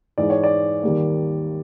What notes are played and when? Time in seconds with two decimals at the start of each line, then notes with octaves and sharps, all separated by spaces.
0.18 G#2 E3 G#3 D5
0.30 C#5
0.44 D5
0.83 D#2 D#3 G3 A#3